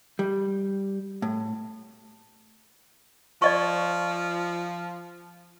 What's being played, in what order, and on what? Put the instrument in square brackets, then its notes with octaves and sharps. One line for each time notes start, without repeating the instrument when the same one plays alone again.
[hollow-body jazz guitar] G3
A2
[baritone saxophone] F3 [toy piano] D5 D#5 C#6